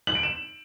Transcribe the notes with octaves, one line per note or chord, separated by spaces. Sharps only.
F#7
D7
E7